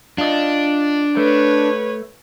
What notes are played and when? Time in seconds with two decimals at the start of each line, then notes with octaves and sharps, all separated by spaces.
0.18 D4 F4 D#5
1.17 A3 B4 C#5